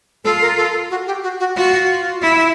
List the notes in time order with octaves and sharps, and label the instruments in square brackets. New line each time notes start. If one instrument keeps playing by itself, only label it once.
[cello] F4 [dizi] A4
[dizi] A#4
A4
F#4
G4
F#4
F#4
[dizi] F4 [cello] F#4
[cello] E4